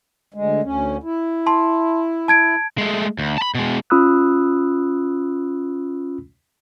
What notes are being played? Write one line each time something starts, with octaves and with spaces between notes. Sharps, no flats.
D2 G#3
D2 C#4
E4
A5 C6
A5 G#6 D7
G#3 A3
D2
A5 B5
B2 G#3
C#4 F4 B5 D#6 E6 F#6